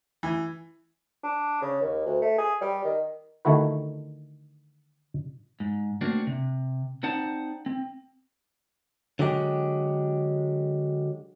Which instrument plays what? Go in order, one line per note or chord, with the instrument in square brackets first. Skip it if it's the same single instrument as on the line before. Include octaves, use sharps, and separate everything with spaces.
[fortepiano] E3
[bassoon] D4
C#3
D#2
D2
A3
G#4
G3
D#3
[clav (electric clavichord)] D3 D#3 A3 E4 F#4 B4
[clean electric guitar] G#2
A3 A#3 C4 D4 F#4
C3
C4 D#4 C5 D5 F#5 A5
C4
D3 F#3 G#3 G4